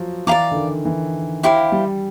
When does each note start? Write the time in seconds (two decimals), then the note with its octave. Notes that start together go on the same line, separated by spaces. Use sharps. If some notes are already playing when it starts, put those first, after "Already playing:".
Already playing: F3 F#3
0.27 E3 D5 F5 A#5 D6
0.51 D3
0.56 D#3
0.85 E3
1.43 E4 G4 C5 F5
1.72 G3